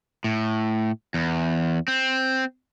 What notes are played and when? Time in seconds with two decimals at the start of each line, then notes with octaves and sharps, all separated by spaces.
0.24 A2
1.14 E2
1.88 C4